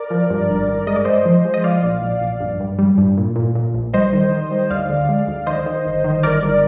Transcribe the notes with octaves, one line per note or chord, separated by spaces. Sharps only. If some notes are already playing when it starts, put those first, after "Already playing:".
Already playing: A#4 D5
F3
G2
G#1
G2
G#3 D#5
D5
G#3 C5 D#5
F3
G#3
D#5
F3 D5 F5
A#1
A#1
A#1
G2
G2
G3
G2
A#2
A#2
A#2
A#1
G3 C5 D#5
D#3
D#3
G3
D2 D5 F5
D3
G#3
D2
D#3 C5 D#5
D#3
G1
D#3
G1 A#4 D5
G1